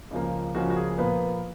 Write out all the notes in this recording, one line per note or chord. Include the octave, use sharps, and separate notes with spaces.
C#2 C#3 F3 A#3
C#2 C#3 F3 A#3 F#4
F#4
G#4
A#2 F3 A#3 B3 B4